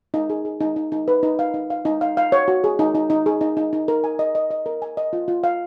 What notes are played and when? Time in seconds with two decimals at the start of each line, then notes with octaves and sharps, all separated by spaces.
0.14 D#4
0.30 G#4
0.45 G#4
0.61 D#4
0.76 D#4
0.92 D#4
1.08 B4
1.23 D#4
1.39 F5
1.54 D#4
1.70 F5
1.85 D#4
2.01 F5
2.17 F5
2.32 C#5
2.48 F#4
2.64 G#4
2.79 D#4
2.95 D#4
3.10 D#4
3.26 G#4
3.41 D#4
3.57 D#4
3.73 D#4
3.88 A#4
4.04 G#5
4.19 D#5
4.35 D#5
4.51 D#5
4.66 A#4
4.82 G#5
4.97 D#5
5.13 F4
5.28 F4
5.44 F5